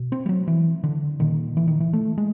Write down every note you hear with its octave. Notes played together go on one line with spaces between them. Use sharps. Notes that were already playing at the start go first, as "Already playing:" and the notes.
Already playing: B2
C4
G3
F#3
E3
D3
A#2 D#3
E3
D#3
E3
A3
G#3